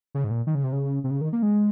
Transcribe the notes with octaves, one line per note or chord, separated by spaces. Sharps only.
C#3
G#2
A#2
D#3
C#3
C3
C#3
C3
C#3
D#3
A#3
G#3